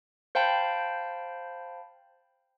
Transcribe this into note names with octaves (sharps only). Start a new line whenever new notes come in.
C5 F5 G5 A5 B5